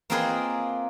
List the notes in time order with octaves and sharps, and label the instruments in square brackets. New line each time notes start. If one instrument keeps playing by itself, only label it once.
[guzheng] A#3 C4 F4 G#4 B4 D#5